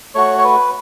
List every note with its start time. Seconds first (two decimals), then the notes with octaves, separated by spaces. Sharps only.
0.15 A3 F#4 C#5
0.38 C#5
0.44 B4